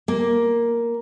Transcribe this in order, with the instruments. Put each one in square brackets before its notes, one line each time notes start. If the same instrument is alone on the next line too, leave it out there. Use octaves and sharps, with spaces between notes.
[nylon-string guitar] A#3